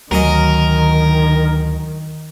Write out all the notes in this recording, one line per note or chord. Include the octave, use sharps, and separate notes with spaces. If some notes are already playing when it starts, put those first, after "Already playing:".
D2 D#3 F#3 C#4 A#4 D#5